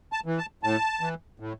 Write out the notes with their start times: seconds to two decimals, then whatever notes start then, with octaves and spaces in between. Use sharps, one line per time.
0.12 A5
0.26 E3
0.38 A5
0.63 A2 A5
1.01 E3
1.40 A2